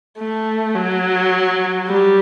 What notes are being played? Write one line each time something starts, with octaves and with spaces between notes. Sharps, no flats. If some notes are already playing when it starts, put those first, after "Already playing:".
A3
F#3
G3